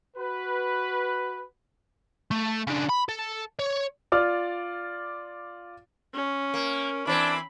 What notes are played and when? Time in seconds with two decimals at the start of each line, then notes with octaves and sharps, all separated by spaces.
0.17 F#4 B4
2.31 A3
2.67 C#3 D4
2.89 B5
3.09 A4
3.59 C#5
4.12 F4 D5 D6 F6
6.14 C#4
6.54 A#3
7.07 E3 C4 D4 B5